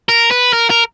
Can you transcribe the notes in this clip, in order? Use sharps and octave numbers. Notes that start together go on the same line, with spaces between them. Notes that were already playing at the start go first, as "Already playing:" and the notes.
A#4
B4
A#4
A#4